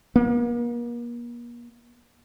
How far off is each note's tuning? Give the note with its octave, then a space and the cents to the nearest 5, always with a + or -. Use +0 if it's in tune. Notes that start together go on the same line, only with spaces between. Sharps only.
A#3 +40